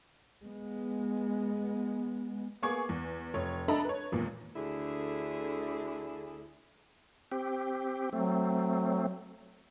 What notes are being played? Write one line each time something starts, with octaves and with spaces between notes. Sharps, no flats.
G#3 B3
A#3 B3 G#4 C#6 D6 G#6
E2
F1 C#5
D4 A4 D#5 E5 A#5 B5
B4 C#5
G#1 E2 A#2
D2 D3 E4 G#4
C4 G4
F#3 A3 C4